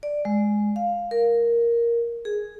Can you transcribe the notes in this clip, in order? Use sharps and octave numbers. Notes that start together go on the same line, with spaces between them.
D5
G#3
F5
A#4
G#4